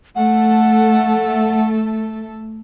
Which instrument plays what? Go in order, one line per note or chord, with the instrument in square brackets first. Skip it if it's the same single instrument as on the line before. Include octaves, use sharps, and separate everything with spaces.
[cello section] A3 A4 [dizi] F#5